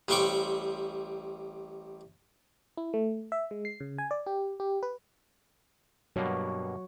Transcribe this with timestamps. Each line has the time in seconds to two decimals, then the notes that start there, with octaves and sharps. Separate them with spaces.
0.08 A1 G3 C4 G5 C#6 D6
2.77 E4
2.94 A3
3.32 E5
3.51 G#3
3.65 C7
3.80 C#3
3.98 G#5
4.11 D5
4.27 G4
4.60 G4
4.83 B4
6.16 G2 B2 F#3 A#3 F#4 C#5